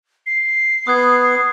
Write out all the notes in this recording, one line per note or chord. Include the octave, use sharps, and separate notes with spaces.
C7
B3 D#6 F#6 G#6